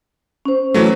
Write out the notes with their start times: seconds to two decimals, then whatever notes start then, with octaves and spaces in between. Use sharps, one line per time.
0.45 C#4 C5
0.74 E3 F#3 A3